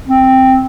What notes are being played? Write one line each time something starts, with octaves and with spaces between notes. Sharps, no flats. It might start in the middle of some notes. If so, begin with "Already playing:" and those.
C4